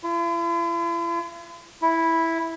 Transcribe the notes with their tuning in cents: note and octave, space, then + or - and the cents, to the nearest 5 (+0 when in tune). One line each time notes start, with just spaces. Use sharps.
E4 +45
E4 -5